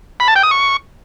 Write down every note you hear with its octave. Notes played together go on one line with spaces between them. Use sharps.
B5
A5
G5
D#6
C#6